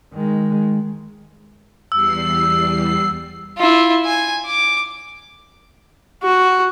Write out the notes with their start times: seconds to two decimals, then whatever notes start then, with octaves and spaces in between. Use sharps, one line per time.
0.14 D#3 G#3
1.92 E2 G3 E6 C7
3.58 E4 F4
4.06 G#5
4.46 D6
6.23 F#4